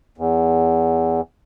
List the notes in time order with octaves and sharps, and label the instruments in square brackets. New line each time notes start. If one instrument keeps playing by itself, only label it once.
[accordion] E2